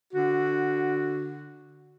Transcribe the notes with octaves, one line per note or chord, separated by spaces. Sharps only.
D3 F#4